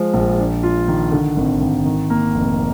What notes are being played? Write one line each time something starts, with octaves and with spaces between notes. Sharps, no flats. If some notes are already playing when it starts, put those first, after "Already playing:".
Already playing: F3 G#3
A#1
D4
F4
D#3
D3
G#1
G#1
D#3
A#3
F1